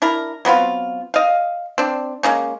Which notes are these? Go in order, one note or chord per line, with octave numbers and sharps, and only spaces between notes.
D4 E4 A#4
F#3 B3 C4 F4
D#5 F5
C4 D4
G#3 A#3 C#4